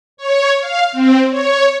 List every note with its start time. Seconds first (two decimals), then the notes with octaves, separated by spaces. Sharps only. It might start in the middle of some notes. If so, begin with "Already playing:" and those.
0.17 C#5
0.60 F5
0.92 C4
1.30 C#5